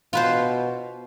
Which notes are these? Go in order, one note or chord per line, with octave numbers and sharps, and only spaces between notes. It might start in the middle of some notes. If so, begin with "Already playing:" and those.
B2 F4 B4 C5